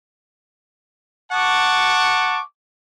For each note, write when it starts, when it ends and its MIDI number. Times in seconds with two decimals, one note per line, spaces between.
1.32 2.41 78
1.32 2.41 81
1.32 2.41 85
1.32 2.41 86